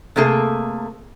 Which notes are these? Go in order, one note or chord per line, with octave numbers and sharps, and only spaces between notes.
C3 A3 A#3 G#4 A4